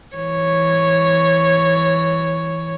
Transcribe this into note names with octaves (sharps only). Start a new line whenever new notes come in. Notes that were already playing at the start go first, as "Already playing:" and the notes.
E3 C#5